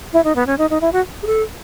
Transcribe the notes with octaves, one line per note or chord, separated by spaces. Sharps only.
E4
D#4
B3
C#4
D#4
D#4
E4
F#4
G#4
A4